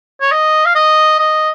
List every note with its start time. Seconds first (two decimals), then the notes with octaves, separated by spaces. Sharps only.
0.21 C#5
0.32 D#5
0.65 F5
0.75 D#5
1.19 D#5